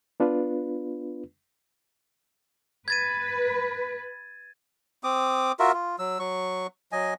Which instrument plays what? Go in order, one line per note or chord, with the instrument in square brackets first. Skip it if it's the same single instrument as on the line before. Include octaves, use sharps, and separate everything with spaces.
[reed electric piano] B3 D4 F4 B4
[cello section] B4 [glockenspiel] G#6 A6 D#7
[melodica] C4 D6 D#6
F4 F#4 A#4 E5
F4
F#3 E6
F#3 C#6
F#3 D#5 G#5